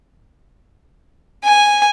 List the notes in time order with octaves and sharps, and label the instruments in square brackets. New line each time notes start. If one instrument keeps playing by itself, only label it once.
[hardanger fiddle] G#5